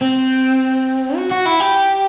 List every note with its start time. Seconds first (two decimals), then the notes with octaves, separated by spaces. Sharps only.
0.01 C4
1.16 F#4
1.32 F#4
1.46 E4
1.61 G4